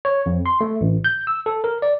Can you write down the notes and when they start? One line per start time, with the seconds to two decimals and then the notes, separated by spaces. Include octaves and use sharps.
0.05 C#5
0.26 F2
0.46 C6
0.61 A3
0.81 A1
1.04 G6
1.27 E6
1.46 A4
1.64 A#4
1.82 D5